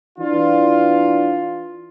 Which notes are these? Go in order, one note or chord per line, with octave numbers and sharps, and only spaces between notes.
E3 D4 F4